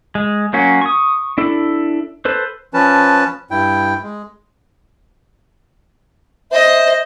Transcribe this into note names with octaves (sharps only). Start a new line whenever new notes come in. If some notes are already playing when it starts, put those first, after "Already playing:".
G#3
F#3 A#3 C#4 F#4
C#6 D#6
D4 E4 A4
A4 B4 C5
F3 C#4 B4 A5
G2 E4 G5
G#3
C5 D#5 E5